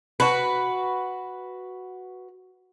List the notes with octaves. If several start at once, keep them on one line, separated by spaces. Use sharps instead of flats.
F#4 B4